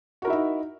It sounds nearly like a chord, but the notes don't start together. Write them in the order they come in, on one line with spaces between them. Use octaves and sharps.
F#4 A#4 E4 E5 D#4